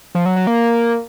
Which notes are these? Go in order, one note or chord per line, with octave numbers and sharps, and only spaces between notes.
F3
F#3
F#3
A#3